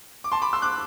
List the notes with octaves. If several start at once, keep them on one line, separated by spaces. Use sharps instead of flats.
D6
A5 C6
B5 D6
C6 E6
D6 F#6